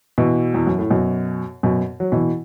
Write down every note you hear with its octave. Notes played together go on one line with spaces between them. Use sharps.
B2 E3
E2
F#2
A2
F#2 B2
F#2 B2
F#3
B2 E3